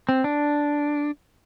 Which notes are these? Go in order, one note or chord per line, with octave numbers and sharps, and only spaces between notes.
C4
D4